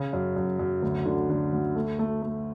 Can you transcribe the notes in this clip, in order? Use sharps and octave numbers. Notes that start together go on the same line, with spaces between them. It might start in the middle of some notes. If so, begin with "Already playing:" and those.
Already playing: C#3
F#2
F#2
F#2
D2
D3
D3
D2
A3
A3
A3